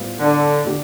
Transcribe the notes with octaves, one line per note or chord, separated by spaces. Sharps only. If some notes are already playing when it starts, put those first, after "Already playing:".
Already playing: A2 G3 B3 F4 C5
D3
D3 A3 D4 G4